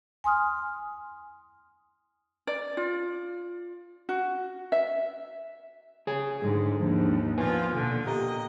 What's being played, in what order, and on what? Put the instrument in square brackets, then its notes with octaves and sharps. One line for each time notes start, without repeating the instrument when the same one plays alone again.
[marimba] G#5 C6 D#6 F6
[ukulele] D5
F4
F#4
E5
[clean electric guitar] G#4 C#5 G#5
[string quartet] G#2 [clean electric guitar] D3 G#3 G#4
[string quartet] D#2 G#2 [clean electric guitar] F3 D4
[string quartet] A#2 F3 F4 [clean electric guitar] B3 B4 G#5
[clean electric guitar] B2 [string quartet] D3
[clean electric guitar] A#2 G4 A#5 [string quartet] D#5